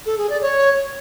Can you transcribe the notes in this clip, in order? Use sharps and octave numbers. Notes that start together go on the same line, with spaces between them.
A4
G#4
D5
C#5